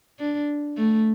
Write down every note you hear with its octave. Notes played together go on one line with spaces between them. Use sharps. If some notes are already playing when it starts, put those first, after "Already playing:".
D4
A3